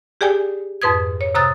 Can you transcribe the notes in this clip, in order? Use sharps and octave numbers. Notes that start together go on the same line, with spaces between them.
G4 G#4 D5 G5 G#5
F2 G#2 B4 D#6 G#6
C#5
C3 A#5 D#6 F#6 A6